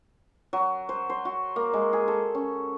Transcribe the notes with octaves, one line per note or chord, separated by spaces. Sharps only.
F#3
C5
C5
F#4
A#3
G#3
G#4
A4
C#4